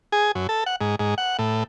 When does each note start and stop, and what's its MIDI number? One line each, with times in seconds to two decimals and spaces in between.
0.12 0.32 68
0.35 0.47 42
0.49 0.64 69
0.66 0.76 78
0.81 0.95 44
0.99 1.15 44
1.18 1.37 78
1.39 1.63 45